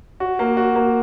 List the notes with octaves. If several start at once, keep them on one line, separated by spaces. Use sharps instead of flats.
F#4
A#3
F#4
A#3